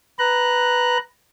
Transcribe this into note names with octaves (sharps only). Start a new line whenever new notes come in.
B4 A#5 F#6